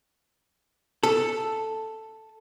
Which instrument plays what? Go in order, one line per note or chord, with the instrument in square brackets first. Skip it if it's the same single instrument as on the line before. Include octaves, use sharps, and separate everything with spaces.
[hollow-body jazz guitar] A4